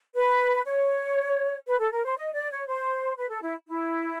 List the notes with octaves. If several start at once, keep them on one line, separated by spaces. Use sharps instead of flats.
B4
C#5
B4
A4
A#4
C5
D#5
D5
C#5
C5
B4
A4
E4
E4